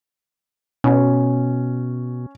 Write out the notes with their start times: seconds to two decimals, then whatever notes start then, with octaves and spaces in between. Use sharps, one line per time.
0.84 B2 C#4